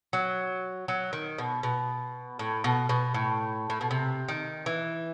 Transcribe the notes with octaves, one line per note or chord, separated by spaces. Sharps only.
F#3
F#3
D#3
B2
B2
A2
B2
B2
A2
A2
B2
C3
D#3
E3